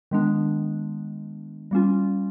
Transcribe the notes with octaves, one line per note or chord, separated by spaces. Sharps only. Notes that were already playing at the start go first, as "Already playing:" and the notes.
D#3 G#3 B3 D4
G3 A#3 C#4 F4